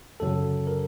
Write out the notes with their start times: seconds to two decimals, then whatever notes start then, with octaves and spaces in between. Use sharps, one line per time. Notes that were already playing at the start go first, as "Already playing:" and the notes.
0.20 G1 F#2 C#3 F#3 A4
0.67 A#4